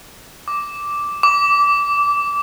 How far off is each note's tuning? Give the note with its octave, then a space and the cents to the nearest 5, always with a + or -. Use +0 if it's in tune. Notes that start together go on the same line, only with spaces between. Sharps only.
D6 -5
D6 -20